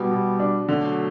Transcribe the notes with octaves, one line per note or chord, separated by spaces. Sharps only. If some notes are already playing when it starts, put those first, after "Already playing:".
Already playing: B2 G3 B3
B2
D4
D3 F#3 A3